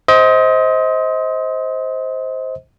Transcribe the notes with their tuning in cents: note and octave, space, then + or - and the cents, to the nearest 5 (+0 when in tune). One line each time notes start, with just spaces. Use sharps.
C5 +0 D#5 +30